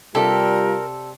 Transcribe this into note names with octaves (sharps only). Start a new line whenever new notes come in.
C3 G3 F4 G4 A4 A#4 D5